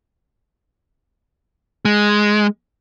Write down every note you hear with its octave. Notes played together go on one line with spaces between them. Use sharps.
G#3